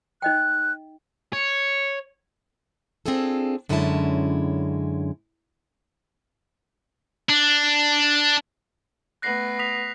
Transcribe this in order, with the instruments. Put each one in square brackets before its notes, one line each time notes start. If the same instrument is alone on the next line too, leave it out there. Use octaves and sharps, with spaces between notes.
[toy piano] D#4 D#5 G5 [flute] F#6
[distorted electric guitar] C#5
[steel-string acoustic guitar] C4 D4 F4 G#4 A4
F#2 D3 G#3 C#4 E4 A5
[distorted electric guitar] D4
[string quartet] A3 B3 [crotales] F#6 A#6 C7
[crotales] D#6 B6 F7